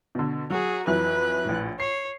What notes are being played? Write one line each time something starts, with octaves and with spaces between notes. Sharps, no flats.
B2 D3
F#3 F#4 G#4
F2 E3 F#3 B4 F#6
A#1 A2
C#5 C7